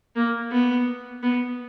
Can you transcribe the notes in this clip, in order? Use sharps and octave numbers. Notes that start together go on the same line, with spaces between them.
A#3
B3
B3